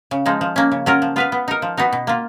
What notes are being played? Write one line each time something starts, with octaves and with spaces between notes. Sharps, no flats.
C#3
F3 G#3 D#4
F3
A#3 C#4
C#3
F#3 C#4 F4 A#4
F3
B3 F4 B4 F5
B3
D#4 A#4
F3
B3 D#4 F#4
B2
A#3 F4